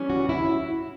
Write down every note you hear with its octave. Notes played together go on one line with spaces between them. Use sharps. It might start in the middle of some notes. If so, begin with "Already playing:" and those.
Already playing: E3 G3 C#4
F#4
E4